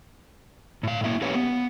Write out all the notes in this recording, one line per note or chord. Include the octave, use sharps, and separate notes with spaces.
A2 F5
A#3 E4 E5
A#3 C#4 G4 B4 C#5 F5
B3